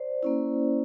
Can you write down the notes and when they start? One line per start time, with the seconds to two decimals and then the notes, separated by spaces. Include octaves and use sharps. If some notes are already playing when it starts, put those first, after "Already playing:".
Already playing: C5 D5
0.23 A#3 C#4 E4